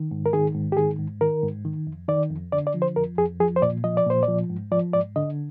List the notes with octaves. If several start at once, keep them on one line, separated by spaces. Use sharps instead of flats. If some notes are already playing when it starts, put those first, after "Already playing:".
Already playing: D#3
G#2
A#4
D#3 G#4
G#2
G4
D#3 G#4
G#2
D#3 A#4
G#2
D#3
F2
D#3 D5
F2
D3 D5
D5
F3
C5
F2 A#4
F2 G#4
F3 G#4
C5
A#2 D5
F3 D#5
D5
A#2 C5
D5
F3
G#2
F3 D5
G#2 D5
D3 D#5